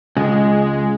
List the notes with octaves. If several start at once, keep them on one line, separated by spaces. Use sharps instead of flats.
C#2 G#3